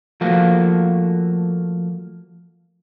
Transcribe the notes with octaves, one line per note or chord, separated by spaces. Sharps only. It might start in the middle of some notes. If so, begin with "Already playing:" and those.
F3 A3 A#3 F#4